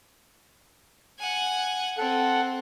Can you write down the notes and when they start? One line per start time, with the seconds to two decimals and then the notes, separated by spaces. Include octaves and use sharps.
1.19 F#5 G#5
1.98 C4 A4 F#5